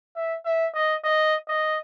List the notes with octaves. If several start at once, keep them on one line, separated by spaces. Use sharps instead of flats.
E5
E5
D#5
D#5
D#5